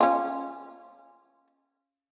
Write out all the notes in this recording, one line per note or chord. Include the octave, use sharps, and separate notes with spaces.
C#4 F4